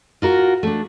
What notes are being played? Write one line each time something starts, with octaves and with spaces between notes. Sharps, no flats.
F4 F#4 A#4
A3 D4